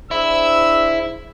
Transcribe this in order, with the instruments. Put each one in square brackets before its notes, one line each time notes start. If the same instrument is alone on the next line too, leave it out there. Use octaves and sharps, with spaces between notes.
[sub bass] D#1 [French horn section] D4 G#4 C5 [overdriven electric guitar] E4 [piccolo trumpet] E6